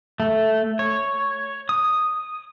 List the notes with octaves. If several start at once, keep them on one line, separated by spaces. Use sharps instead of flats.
A3
C#5
D#6